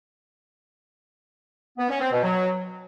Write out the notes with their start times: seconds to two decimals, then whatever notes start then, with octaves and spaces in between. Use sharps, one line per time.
1.78 B3
1.89 C#4
2.00 C4
2.11 B2
2.23 F#3